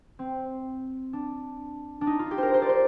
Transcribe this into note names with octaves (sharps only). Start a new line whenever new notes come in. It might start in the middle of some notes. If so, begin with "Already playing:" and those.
C4
D4
D4
D#4
F4
G4
A#4 C5
C5
D5
C5